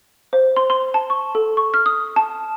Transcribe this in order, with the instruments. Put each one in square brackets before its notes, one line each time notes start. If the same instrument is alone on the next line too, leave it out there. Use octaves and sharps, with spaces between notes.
[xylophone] C5
C6
C6
A5
C#6
A4
C#6
F6
D#6
A5